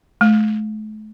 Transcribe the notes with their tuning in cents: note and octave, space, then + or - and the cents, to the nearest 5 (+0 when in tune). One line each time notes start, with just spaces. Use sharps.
A3 -40